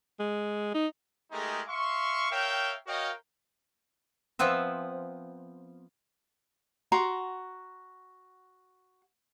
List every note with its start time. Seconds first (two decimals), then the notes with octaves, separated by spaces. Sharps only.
0.19 G#3
0.75 D#4
1.31 G#3 A3 D#4 G4 G#4 A#4
1.68 E5 F5 C6 C#6
2.31 A#4 C#5 E5 F5 G5
2.87 F#4 A#4 C#5 D#5 F5 G5
4.39 F3 B3 C4 B4 E5
6.92 F#4 A#5 C6